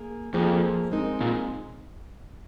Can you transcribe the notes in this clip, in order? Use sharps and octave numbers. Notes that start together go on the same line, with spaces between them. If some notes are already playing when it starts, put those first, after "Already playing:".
Already playing: A#3 G#4
F2 F3 A#3 G#4 C5
G#3 C4 D#4 A#4
A#2